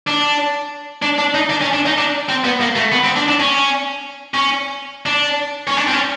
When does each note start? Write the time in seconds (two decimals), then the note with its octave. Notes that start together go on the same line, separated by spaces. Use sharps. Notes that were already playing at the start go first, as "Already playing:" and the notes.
0.07 D4
1.02 D4
1.19 D4
1.35 D#4
1.50 D4
1.61 C#4
1.73 D4
1.86 D#4
1.98 D4
2.29 C4
2.45 B3
2.61 A#3
2.76 A3
2.92 B3
3.04 C4
3.16 D4
3.28 D4
3.40 C#4
4.34 C#4
5.06 D4
5.68 C#4
5.77 D4
5.87 C4
5.93 C#4